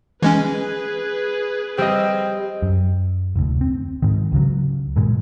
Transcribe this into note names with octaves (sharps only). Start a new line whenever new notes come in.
E3 G#3 C#4 G#4 B4 G#5
G3 C4 D#5
F#2
F1 D2
C4
G#2 D#3
C#2 C#3 F#3
G2 A#2 D#3 G#3